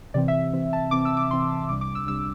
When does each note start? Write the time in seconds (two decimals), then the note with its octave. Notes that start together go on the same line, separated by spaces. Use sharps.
0.14 C3 E3 C4 D5
0.28 E5
0.53 C3 E3 C4
0.73 A5
0.91 C3 E3 C4 D6
1.05 E6
1.17 D6
1.30 C3 E3 C4 C6
1.69 C2 C3 G3 D4 D6
1.81 D6
1.95 E6
2.07 C3 G3 D4 E6